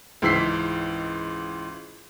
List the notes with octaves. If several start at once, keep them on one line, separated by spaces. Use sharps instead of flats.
C#2 G#2 E3 E6 B6 C7